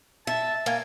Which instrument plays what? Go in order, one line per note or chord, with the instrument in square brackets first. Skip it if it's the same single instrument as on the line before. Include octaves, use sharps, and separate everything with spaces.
[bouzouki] E5 [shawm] A5
[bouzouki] A#3 [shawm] G#5